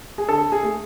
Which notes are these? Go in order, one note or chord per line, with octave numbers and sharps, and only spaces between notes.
G#4
D3 A4
G#4
A3